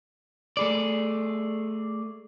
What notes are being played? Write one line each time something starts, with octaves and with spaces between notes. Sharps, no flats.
A3 G#4 D5